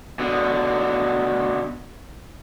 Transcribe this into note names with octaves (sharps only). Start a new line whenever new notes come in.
B2 D3